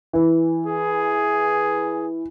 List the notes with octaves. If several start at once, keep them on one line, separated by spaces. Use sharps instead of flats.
E3
G#4